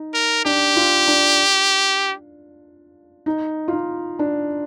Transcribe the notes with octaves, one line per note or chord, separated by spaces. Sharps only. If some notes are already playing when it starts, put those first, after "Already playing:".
Already playing: D#4
A#4
D4 G4
F4
D4
D#4
F4
D#4
D4